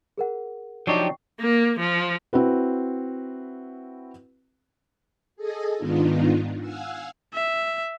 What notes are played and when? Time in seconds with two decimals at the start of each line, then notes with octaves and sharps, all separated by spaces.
0.18 G#4 A#4 F#5
0.87 F3 F#3 D4 D#4 G4 G5 C#6 C7
1.40 A#3
1.80 F3
2.33 C4 E4 F#4 B4
5.36 G#4 A4 D#5 G#5
5.77 G#2 D#3 B3 D4 D#4 F4
6.59 F5 F#5 G#5 E6
7.34 E5